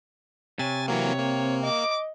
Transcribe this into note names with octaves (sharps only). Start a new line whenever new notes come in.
C3 C#5 G#5 A6
E3 F#3 A#3 C4 C#5
A#3
D#5 D6